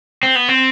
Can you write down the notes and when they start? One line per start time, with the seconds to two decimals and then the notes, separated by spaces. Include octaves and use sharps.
0.23 C4
0.36 B3
0.48 C4